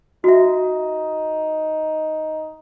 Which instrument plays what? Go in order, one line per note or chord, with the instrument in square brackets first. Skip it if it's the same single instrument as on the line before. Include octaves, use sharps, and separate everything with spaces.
[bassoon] D#4 [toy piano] F#4 E5